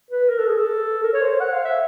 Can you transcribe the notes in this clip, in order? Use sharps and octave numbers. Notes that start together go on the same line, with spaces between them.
B4
A#4
A4
G#4
A4
A#4
C#5
C5
F#5
F5
E5